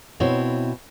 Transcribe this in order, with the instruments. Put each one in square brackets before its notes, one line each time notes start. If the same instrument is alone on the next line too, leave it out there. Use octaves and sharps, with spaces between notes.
[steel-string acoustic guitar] B2 C4 E4 C#5